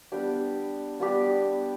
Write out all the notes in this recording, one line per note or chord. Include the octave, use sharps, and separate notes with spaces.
G3 B3 D4 G4
G3 B3 D4 G4